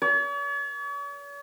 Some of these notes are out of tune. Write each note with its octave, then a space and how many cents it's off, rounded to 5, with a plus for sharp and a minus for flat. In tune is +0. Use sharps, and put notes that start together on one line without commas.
C#5 +45